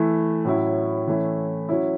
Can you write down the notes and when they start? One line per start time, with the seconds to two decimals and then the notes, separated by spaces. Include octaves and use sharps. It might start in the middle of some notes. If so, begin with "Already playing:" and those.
Already playing: E3 A3 E4
0.45 A2 F#3 C#4 E4
1.07 E3 A3 C#4 E4
1.69 F#3 C#4 E4